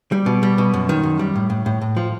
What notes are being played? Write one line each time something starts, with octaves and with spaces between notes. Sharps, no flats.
G3
B2
G3
B2
F#2
D#3
F#2
G3
A2
A2
A2
A2
F3